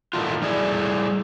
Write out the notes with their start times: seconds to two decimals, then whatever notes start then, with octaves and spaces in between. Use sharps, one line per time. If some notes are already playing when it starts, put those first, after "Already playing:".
0.13 A2 D#3 A3 F4
0.42 G3 A3 E4 G#4